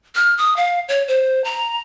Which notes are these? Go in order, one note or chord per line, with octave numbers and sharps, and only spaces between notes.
F6
D#6
F5
C#5
C5
A#5